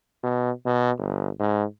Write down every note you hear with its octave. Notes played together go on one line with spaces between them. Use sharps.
B2
B2
G1
G#2